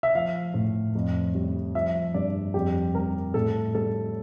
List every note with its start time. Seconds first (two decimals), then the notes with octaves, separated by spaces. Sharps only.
0.03 E5
0.15 F3 F5
0.54 A2
0.95 F2
1.35 G3
1.75 F3 E5
2.14 G2 D5
2.54 F2 G4
2.95 G3 A#4
3.34 A2 A4
3.75 G3 A4